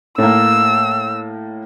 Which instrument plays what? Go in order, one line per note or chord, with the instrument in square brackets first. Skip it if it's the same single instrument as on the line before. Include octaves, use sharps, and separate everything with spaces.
[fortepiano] A2 A#3 [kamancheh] E6